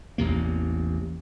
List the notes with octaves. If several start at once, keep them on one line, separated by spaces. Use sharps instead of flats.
A1 E2 C3 A#3